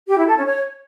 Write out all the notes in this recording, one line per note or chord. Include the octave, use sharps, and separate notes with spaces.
G4
E4
A4
C#4
C#5